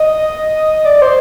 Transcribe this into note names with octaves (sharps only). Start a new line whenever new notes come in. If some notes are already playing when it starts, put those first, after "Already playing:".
Already playing: D#5
D5
C5